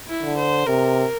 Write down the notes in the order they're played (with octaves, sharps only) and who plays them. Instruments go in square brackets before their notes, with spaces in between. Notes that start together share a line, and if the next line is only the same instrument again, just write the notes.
[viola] E4
[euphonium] D3
[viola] C5
[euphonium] C3 [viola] A#4